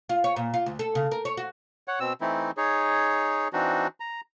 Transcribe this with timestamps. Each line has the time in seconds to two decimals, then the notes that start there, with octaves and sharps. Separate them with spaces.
0.09 F4
0.24 C#5
0.36 A#2
0.54 F4
0.66 D2
0.79 A4
0.95 C#3
1.11 A#4
1.25 C#5
1.37 F#4
1.88 C#5 F#5
2.00 B2 C4 E6
2.21 E3 A3 C4 D#4 E4
2.57 D#4 G#4 C#5
3.53 E3 C4 D4 D#4 F#4
4.00 A#5